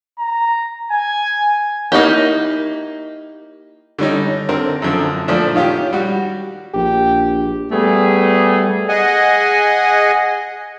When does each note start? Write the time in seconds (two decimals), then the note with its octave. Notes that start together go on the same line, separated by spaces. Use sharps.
0.20 A#5
0.92 G#5
1.92 A#3 D#4 E4 G4
3.99 D3 G3 C#4 D#4
4.49 D3 C4 A#4
4.82 F#2 D3 F3
5.28 A#2 F3 A3 D4
5.55 D#3 C#4 F4 G4
5.93 G3 F#4
6.74 A#1 G4
7.71 G3 A3 B3 G#4
8.89 G#4 D#5 F#5 G#5